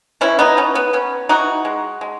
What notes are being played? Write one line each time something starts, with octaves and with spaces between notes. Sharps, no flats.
E3 C#4 E4
B3 D#4
B3 C#4
B3
B3 C#4
E3 D#4 F#4
G#3
G#3